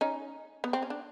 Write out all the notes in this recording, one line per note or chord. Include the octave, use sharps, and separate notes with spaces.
C#4 D#4
B3
C4
C#4
D4